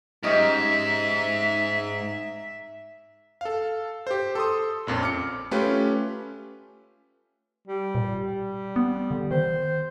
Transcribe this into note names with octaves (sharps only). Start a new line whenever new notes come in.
G#2 C#4 G4 D#5 E5
A4 F5
G4 C5
A4 C6 D#6
A#1 F2 A#2 C#4
D6 F6 C#7
A3 C#4 F4 G4 B4
G3
A#2
G3
B3
D3
D#3 C5